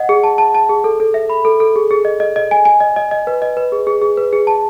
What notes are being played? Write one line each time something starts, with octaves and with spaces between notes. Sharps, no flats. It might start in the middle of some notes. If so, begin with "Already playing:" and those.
Already playing: D#5 F#5
G#4
A5
A5
A5
G#4
A4
A4
E5
B5
A4
A4
G#4
G#4
D#5
D#5
D#5
G#5
G#5
D#5
D#5
D#5
B4
D#5
B4
G#4
G#4
G#4
B4
G#4
A5